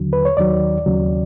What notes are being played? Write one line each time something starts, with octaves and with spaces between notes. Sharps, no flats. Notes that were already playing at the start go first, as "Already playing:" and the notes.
Already playing: D#2 D3 F#3
B4
C#5
D#2 D#3 F#3 D5
D#2 C#3 F#3